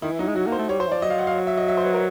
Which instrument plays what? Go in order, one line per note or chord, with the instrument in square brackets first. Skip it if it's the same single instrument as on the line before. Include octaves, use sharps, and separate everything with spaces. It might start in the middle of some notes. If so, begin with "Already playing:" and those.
[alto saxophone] D#3 [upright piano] E4
[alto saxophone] E3
[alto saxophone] F#3 [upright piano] D#4
[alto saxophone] G#3
[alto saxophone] F#3 [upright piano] F#4
[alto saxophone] A#3
[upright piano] C5
[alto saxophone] A3
[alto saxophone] G3 [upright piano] C#5
[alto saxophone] F#3 [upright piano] C5
[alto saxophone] E3
[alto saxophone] F3 [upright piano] D5
[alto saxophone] F#3 [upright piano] D#5
[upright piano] F5
F#5
F5
E5
D#5
E5
C5
B4
A#4